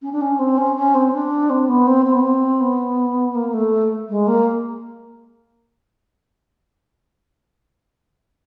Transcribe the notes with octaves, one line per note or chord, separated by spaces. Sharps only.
C#4
D4
C#4
C4
C#4
C#4
C4
D4
C4
B3
C4
C4
B3
C4
B3
A#3
A3
G#3
A#3